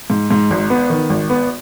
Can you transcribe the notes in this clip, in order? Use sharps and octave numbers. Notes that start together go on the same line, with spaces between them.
G#2
G#2
G#1
B3
D#3
G#1
B3